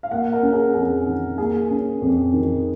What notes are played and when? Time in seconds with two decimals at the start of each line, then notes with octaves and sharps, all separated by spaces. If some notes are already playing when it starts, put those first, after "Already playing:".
0.03 F5
0.11 A#3 F#5
0.33 A#4
0.43 C#4
0.53 G#4
0.74 F2 G#4
1.07 D#3
1.38 A#3 G#4
1.70 C#4
2.02 F2
2.33 D#3